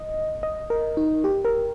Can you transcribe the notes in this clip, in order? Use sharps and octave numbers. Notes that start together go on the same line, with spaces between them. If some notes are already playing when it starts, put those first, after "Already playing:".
Already playing: D#5
D#5
A#4
D#4
G4
A#4